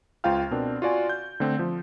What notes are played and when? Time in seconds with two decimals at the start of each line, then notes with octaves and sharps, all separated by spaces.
0.24 C#2 F4 C5 F5 G5 F6
0.51 B2 C4 D4 A#4
0.82 F4 F#4 D5 G#5
1.09 G6
1.40 D3 A3 C4
1.59 F3